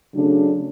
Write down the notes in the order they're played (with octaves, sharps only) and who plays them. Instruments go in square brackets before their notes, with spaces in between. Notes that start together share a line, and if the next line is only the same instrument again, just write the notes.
[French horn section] C#3 F#3 A3 D4 A4